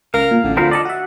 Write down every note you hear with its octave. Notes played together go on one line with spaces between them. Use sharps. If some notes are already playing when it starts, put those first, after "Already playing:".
C#2 A#4 F5
A#2
A1 D3
D2 F3 C4 A#4 F5 B5
A4 D5 D#5 A5
F#4 E5 F#5